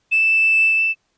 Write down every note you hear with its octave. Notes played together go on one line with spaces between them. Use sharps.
E7